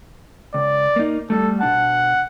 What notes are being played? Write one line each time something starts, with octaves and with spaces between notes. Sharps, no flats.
C#2 D5
A#3 D#4
G3 A3 A4
B2 D4 F#5 A5